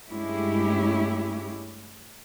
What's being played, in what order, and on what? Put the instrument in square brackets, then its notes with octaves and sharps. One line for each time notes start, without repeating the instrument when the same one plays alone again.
[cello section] G2 G#3 A3 C#4 E4 G4